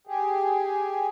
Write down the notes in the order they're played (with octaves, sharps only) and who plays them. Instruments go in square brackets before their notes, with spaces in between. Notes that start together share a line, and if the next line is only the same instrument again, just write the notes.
[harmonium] G4 G#4